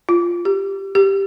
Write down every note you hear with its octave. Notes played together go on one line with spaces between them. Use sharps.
F4
G4
G4